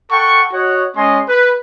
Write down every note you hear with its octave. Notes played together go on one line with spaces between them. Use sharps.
A4 F#5 G5 C#6
F#4 C#5 D#5 F#5
G#3 C#4 D#5 G#5 C6
B4